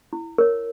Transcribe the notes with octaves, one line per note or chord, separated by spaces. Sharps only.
E4
A#4 C#5